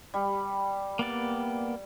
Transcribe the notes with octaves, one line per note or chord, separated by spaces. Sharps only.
G3
A#3 B3 D5